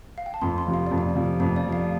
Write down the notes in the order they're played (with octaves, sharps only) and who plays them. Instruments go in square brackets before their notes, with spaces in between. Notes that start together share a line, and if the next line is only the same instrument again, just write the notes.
[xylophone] F5
G5
A5
[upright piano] F2 [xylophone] C6
[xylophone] C6
[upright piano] C3 F3
[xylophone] F5
[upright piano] F2 [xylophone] D5
[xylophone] F5
[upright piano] C3 F3
[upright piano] F2 [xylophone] F5
[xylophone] D5
[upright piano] C3 F3
[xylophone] F5